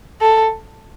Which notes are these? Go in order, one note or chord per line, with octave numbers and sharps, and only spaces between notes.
A4